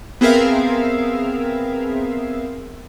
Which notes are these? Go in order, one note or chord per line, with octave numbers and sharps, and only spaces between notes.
B3 C4 G#4 A#4 E5 F5